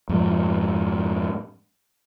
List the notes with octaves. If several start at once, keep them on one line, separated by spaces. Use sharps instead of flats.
F2 G#2 F3